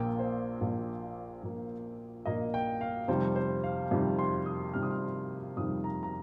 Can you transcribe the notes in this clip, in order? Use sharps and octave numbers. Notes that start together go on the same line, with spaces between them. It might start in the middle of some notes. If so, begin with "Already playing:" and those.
Already playing: A#1 A#2 A#3 G5
C5
A#1 A#2 A#3
A#1 A#2 A#3
A#1 A#2 A#3 D#5
G5
F5
F2 C3 D#3 G3 C5
C5
F5
F2 C3 D#3 G3
C6
D#6
F2 C3 D#3 G3 F6
D#6
F6
F2 C3 D#3 G3 D#6
A#5
A#5